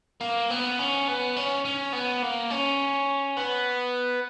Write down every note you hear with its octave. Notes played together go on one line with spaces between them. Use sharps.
A#3
B3
C#4
B3
C#4
C#4
B3
A#3
C#4
B3